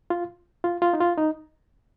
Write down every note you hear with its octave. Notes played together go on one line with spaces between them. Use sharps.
F4
F4
F4
D#4
F4
D#4